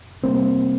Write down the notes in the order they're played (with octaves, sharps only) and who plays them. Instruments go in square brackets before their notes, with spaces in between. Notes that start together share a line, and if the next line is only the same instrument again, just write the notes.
[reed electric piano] C3 G3 A#3 C4